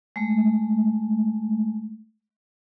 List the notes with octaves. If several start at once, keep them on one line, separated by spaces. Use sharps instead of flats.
G#3 A3